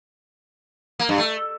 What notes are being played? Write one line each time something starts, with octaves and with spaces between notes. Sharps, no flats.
A#3
G2
A3